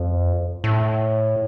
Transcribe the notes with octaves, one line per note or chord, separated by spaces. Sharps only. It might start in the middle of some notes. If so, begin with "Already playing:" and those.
Already playing: F2
A2